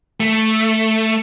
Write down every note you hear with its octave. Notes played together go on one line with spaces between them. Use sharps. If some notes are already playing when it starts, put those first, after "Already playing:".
A3